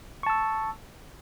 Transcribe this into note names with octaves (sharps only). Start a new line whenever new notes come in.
A5 C#6 E6